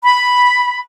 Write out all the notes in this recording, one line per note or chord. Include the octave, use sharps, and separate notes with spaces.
B5